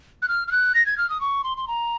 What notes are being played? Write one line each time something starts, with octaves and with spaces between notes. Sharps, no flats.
F#6
F6
F6
F#6
A#6
G#6
F6
D#6
C#6
C6
C6
A#5